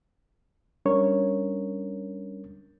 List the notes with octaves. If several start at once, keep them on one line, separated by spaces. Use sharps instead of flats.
G3 C#4 D4 A#4 C#5